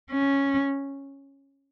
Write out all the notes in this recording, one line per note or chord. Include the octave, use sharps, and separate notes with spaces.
C#4